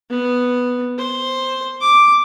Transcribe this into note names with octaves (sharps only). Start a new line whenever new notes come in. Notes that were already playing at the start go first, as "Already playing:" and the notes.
B3
C5
D6